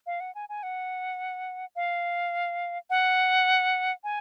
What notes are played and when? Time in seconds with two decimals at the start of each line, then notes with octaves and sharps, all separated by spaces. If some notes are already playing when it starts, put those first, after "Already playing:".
0.07 F5
0.20 F#5
0.35 G#5
0.49 G#5
0.63 F#5
1.76 F5
2.90 F#5
4.04 G#5